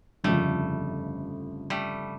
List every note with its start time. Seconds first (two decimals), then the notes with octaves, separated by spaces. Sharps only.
0.24 G1 F2 C#3 F3 G3 A3
1.70 G3 A3